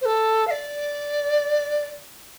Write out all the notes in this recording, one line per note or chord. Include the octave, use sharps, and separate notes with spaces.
C5
A4
F5
D5